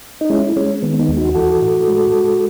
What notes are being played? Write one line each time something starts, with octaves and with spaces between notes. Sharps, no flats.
D#4
G#3 C#4 E4
G#3 C#4
D#3 B3
B3 D#4
D#2
D#4 F#4
E3 F#4 A4
A2
G#3
G#3